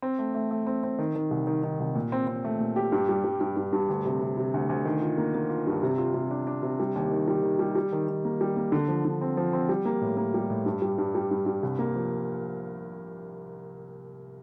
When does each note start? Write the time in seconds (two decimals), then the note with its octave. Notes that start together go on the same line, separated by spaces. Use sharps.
0.02 C4
0.19 A3
0.35 A3
0.51 A3
0.67 C4
0.83 C4
0.99 D#3
1.16 D#3
1.31 C2
1.47 D#3
1.63 D#3
1.80 C2
1.95 A#2
2.12 C4
2.27 C4
2.44 A3
2.60 A#2
2.76 G4
2.92 G2
3.09 G3
3.24 G3
3.41 G2
3.57 G2
3.73 G2
3.89 D2
4.05 C3
4.21 C3
4.37 C3
4.54 D2
4.69 D2
4.85 D#3
5.02 F4
5.18 A#3
5.35 A#3
5.50 F4
5.67 G2
5.83 C3
5.98 F4
6.14 C3
6.31 D4
6.47 D4
6.63 C3
6.80 G3
6.95 D#2
7.11 D#3
7.28 G3
7.43 D#3
7.59 G3
7.75 G3
7.92 D#3
8.09 D#3
8.25 A#3
8.41 G3
8.57 A#3
8.72 D3
8.88 F3
9.05 D3
9.21 C4
9.37 F3
9.53 C4
9.69 G3
9.85 A#3
10.01 A2
10.17 A#3
10.34 G3
10.50 A2
10.66 G2
10.82 G3
10.98 G2
11.15 G3
11.31 G2
11.46 G2
11.63 C2
11.79 A#3
11.95 F3